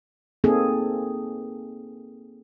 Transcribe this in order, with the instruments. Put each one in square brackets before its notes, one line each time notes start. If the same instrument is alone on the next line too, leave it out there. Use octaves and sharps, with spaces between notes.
[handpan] A#3 C4 D#4 G#4 A4